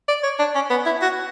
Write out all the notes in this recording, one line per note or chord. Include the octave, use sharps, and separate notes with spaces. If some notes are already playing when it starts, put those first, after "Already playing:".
D5
C#5
D4
C#4
B3
E4
F#4